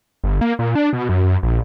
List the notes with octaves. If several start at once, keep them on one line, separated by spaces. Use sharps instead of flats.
G1
A#3
A#2
D4
B2
F#2
F#2
A#1